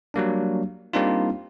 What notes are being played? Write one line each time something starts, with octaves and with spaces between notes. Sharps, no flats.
F#3 G3 A#3 D4
G3 A#3 C4 D4 D#4 F4